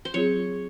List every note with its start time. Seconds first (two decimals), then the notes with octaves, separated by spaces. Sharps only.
0.05 C5
0.14 F#3 C4 F4 G#4 C#5